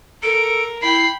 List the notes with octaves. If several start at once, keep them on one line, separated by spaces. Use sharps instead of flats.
A4 A#4 D7
E4 G5 B5 C7